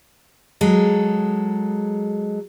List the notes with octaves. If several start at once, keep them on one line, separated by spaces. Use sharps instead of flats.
F#3 G#3 A4